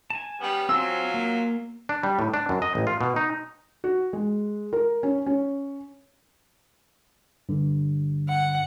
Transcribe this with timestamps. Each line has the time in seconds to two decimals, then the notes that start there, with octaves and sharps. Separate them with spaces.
0.10 G#5 A5
0.40 G3 B3 C#4
0.69 F#3 C4 F4 G#5 E6
1.14 A#3
1.89 D4
2.03 G3
2.19 A2
2.34 D4
2.49 F#2
2.62 D#5
2.75 A1
2.87 F4
3.01 B2
3.16 D#4
3.84 F#4
4.13 G#3
4.73 A#4
5.03 C#4
5.26 C#4
7.49 G2 D3
8.29 F#5